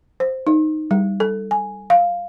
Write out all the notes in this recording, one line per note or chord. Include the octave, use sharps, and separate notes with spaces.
C5
D#4
G3
A4
G#5
F5